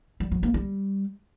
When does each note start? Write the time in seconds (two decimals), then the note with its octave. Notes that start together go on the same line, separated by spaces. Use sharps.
0.20 G3
0.31 F#3
0.43 A#3
0.54 G3